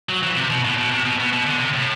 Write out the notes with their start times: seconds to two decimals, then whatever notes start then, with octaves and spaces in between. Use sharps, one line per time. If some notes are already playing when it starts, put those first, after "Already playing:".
0.09 F#3
0.23 E3
0.37 C3
0.50 B2
0.65 A2
0.78 B2
0.92 C3
1.06 B2
1.19 B2
1.33 B2
1.47 D3
1.60 C3
1.74 A2